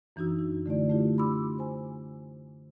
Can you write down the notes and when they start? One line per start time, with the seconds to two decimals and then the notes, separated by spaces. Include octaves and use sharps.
0.16 F#2 E3 D4 D#4 F#4 E6
0.39 D#4
0.66 D3 A3 E4 D5
0.89 A3 D4 E4 F4 G4
1.18 B5 C6 D6 E6
1.59 C5 G#5